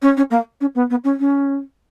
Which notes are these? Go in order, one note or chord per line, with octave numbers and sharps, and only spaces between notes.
C#4
C#4
A#3
C#4
B3
B3
C#4
C#4